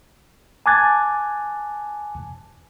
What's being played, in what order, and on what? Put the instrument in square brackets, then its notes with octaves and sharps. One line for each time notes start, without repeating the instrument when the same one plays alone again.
[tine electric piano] G#5 A5 D6 F#6 G#6 A6